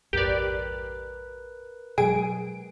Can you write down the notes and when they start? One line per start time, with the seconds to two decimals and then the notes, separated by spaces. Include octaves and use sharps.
0.13 A#1 F2 G#2 G4 A#4 B4 D5
1.98 B2 F#3 G#3 G#4 D7